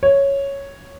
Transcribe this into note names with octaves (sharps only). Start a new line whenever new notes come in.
C#5